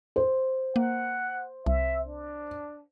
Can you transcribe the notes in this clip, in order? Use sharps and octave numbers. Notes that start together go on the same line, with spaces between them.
C5
A#3 F#5
C2 E5
D4